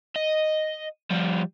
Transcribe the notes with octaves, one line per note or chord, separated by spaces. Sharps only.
D#5
F3 G3